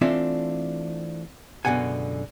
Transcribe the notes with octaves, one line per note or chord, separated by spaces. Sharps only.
E3 A3 C4 D4 F4 E5
C#2 F#2 B2 D3 F#5 G#5